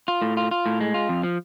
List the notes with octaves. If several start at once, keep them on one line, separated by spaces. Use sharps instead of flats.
F4
A2
F4
F4
A2
G#3
F4
F2
F3